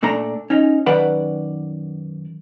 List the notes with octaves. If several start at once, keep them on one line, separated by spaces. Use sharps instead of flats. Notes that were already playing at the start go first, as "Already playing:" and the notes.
A#2 A3 D4 A#5
C#4 D#4
F#2 D#3 B4 D5 F#5